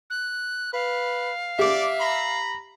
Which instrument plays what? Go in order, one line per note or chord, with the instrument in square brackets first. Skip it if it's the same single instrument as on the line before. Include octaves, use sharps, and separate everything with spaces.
[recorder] F#6
[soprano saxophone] B4 [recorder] F5
[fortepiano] G4 [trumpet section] D5 D6 [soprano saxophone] E5
[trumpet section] A#5 B5